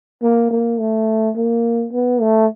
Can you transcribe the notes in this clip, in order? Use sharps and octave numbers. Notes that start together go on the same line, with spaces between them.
A#3
A#3
A3
A#3
B3
A3